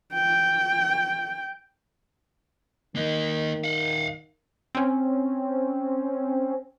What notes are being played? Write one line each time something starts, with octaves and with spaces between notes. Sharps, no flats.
G5
D#3 A#3 D#5
F5 F#5
C4 C#4